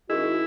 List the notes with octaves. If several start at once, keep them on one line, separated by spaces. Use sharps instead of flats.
D#3 G#3 C#4 E4 F#4